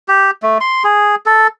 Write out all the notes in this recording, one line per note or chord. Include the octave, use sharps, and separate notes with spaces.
G4
A3
C6
G#4
A4